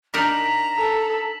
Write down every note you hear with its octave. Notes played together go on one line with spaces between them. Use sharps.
D4 D#4 A#4 A#5 B6 E7 F#7
A4